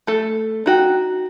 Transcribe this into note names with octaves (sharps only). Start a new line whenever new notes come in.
A3 A4
D#4 F#4 G5